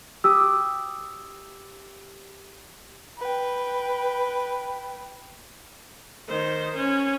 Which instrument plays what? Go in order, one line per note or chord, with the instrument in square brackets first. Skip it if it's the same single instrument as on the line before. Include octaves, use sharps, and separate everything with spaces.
[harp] G4 D#6 [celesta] E6
[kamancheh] B4 G5
[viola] D#3 C5
C#4